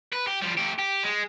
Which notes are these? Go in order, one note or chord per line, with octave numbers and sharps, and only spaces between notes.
B4
G4
F3 G3
A3 G4
G4
G#3